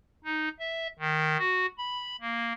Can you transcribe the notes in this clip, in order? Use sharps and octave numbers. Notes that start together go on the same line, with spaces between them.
D#4
E5
D#3
F#4
B5
A#3